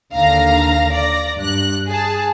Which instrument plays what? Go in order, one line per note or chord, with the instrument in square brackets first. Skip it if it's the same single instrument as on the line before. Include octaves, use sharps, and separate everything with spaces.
[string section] D#2 D3 F5 A#5 A#6
D5 A#6
G2 F#6
G#4 A5